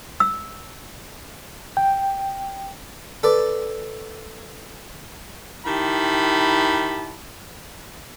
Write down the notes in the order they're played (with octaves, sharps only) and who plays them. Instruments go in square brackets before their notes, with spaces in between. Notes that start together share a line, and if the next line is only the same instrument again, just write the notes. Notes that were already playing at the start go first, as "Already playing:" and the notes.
[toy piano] E6
[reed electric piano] G5
[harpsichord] A4 B4 D5
[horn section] D#3 E4 G4 A5 B5